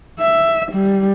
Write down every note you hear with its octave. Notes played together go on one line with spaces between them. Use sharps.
E5
G3